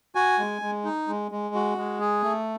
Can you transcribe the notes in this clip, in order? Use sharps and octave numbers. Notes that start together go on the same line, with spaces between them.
F#4 G#5
G#3
G#3
D#4
G#3
G#3
F#4
G#3
G#4
A3